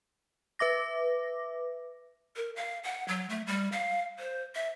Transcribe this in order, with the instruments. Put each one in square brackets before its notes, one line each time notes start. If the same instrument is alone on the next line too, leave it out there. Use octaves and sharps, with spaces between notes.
[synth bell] B4 E5 D6 A#6
[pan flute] A#4
F5
F#5
F#3
A3
G3
F5
C5
E5